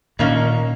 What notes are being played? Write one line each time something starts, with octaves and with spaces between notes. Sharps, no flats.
A#2 D#3 A#3 C#4